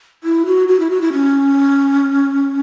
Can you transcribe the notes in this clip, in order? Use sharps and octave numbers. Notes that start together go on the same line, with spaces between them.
E4
F#4
F#4
E4
F#4
E4
C#4